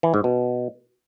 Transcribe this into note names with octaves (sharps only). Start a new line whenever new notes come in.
E3
G#2
B2